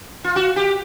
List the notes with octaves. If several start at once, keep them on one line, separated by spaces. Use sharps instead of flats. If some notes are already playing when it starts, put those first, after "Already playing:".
F4
F#4
G4